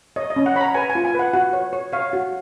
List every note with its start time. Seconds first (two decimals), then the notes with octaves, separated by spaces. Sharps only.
0.16 C#5 D#5
0.30 D#5
0.36 C#4
0.46 F#5
0.55 C#5 B5
0.61 A#5
0.74 B4 G#5
0.90 G#5
0.95 F4
1.05 G#5
1.15 B4 F#5
1.33 F#4 F#5
1.53 C#5
1.73 C#5
1.92 C#5 F5
2.13 F#4